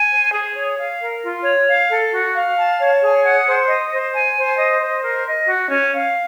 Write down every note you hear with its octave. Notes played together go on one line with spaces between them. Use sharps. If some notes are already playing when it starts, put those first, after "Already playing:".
Already playing: G#5
C5
G#4
C#5
F5
A#4
F4
C#5
F5
A4
F#4
F5
A5
C#5
G#4
F#5
C5
D#5
C5
G#5
C5
D#5
C5
A#4
D#5
F#4
C#4
F5